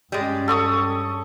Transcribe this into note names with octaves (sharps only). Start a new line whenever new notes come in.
G2 G3 G#3 C#4
A4 C#6 D#6